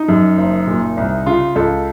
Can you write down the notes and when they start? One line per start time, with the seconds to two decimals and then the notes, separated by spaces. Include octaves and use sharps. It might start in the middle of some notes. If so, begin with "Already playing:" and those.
Already playing: D#4
0.08 F#2
0.37 F#1
0.67 A#2
0.97 C2
1.26 C#3 F4
1.56 C#2 A4